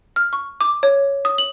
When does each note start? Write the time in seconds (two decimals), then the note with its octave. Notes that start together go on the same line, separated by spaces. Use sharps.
0.16 F6
0.33 C#6
0.61 D6
0.83 C#5
1.25 D#6
1.38 F#7